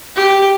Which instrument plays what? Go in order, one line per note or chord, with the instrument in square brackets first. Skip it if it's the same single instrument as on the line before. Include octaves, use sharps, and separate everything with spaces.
[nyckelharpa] G4